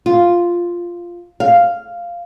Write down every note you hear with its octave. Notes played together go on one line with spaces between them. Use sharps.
F4
F5